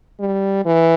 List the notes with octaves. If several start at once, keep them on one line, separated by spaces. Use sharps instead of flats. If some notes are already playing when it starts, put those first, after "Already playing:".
G3
E3